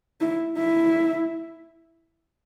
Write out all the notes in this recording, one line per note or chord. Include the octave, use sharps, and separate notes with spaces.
E4
E4